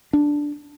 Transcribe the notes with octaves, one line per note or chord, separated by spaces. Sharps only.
D4